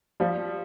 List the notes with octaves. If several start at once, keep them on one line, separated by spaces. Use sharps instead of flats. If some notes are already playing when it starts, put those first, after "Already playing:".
F3 G3